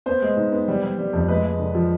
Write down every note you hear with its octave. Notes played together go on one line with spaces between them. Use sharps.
B3 C5
G#3
G#2
B3
G3
G3
G3
F2
G#3 B4
G#3
D3
F3